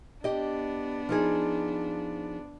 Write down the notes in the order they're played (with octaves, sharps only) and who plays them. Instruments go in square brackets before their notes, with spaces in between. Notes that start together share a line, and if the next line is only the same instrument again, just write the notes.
[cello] B3 D4 [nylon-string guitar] G4 D#5
[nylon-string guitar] F3 D#4 G#4